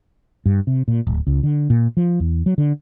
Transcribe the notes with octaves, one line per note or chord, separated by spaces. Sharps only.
G2
C3
A#2
D1
C#2
D3
A#2
F3
E2
F#3
D3